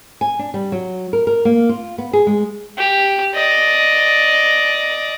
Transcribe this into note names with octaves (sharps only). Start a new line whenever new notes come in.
G#5
D4
G3
F#3
A#4
A#4
A#3
F4
B3
G#4
G#3
G4
D5 D#5